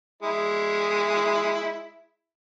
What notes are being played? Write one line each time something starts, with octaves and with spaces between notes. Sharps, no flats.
G#3 E4